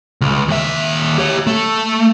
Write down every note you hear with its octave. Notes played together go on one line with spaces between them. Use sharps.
C#2
D#2 E5
G4 C#5
A3